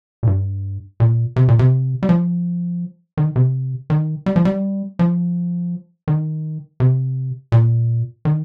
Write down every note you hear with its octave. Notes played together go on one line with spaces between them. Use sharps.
A#2
G2
A#2
C3
A#2
C3
G3
F3
D#3
C3
D#3
G3
F3
G3
F3
D#3
C3
A#2
D#3